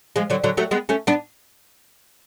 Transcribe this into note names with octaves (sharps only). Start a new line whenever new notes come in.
F3 G#3
D3 F#3
D3 F#3
F#3 A3
G#3 B3
A3 C#4
B3 D4